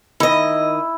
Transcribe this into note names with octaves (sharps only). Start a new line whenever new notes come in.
D#3 E4 D#5